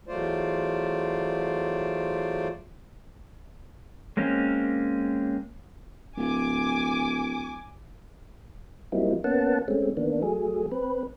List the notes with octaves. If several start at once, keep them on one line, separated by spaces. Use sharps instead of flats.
E2 F#3 A3 F4 C5 D5
G#3 A#3 C4 C#4
D1 G#5 D6
F#3 G3 A#3 C4 D#4 E4
A#3 B3 C#4 F#5 A5
G#3 A3 C4 C#4
D#3 A#3 B3 D4
F#3 A3 G#4
C4 B4